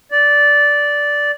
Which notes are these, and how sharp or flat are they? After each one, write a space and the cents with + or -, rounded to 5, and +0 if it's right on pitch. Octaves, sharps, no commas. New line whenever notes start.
D5 -10